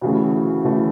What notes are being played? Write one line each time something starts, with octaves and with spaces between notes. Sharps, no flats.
D2 C#3 E3 A3
D2 C#3 E3 A3